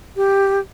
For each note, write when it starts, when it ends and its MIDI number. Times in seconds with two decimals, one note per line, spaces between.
0.16 0.60 67